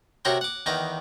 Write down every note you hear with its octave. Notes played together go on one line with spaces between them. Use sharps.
C3 F#4 A#4 C#5 G5 C6
F#5 D6
E2 D#3 B4 G5 A#5